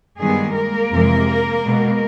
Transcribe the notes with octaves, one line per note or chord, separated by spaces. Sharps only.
G2 D#3 G3 G#3 B3 G#4
A#3 A#4
F2 C3 E3 G#3
B2 G#3 B3